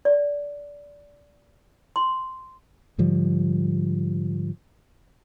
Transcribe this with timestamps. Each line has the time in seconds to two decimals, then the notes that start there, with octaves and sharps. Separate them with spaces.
0.05 D5
1.96 C6
2.98 G#2 D3 F3 G3